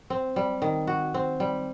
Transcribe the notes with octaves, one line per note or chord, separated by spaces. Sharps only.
C4
G3
D#3
F#4
C4
G3